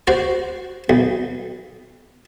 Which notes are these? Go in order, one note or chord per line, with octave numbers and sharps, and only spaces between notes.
F#4 C5 D5
B1